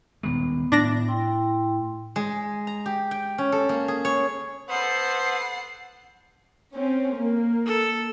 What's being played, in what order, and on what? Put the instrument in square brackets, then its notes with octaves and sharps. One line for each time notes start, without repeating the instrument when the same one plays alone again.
[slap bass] D#1 D#3 G#3 [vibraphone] B3
[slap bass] A2 [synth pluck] D4 A#6
[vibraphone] E4 G5 C6
[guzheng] G#3
A#5
G4
G5
C#4
A4
A#3
G#4
C#5
[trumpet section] B3 A4 C5 [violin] F#5 C7
[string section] C4 C#4
A#3
[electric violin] A4